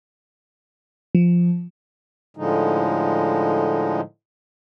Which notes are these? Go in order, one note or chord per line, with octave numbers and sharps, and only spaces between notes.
F3
A2 D3 F3 G#3 D#4